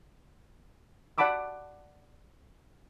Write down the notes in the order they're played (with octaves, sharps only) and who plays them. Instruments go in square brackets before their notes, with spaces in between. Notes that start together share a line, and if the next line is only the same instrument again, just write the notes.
[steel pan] D5 F#5 A5 B5 D6 E6